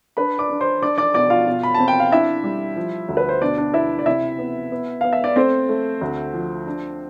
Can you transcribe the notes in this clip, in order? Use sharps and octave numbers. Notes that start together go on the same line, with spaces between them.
D4 B4 B5
D5 D6
D4
C5 C6
D4 D5 D6
D5 D6
B2 D5 D6
F4 F5
B2
B5
C4 A5
G5
F5
D4 E4 E5
G3
F3
D2
B4
C5
B2 D4 D5
D4 D5
B3 E4 E5
D5
C3 E4 E5
B3
B3
B3 F5
E5
D5
A3 C4 C5
A3
D2
F3
D4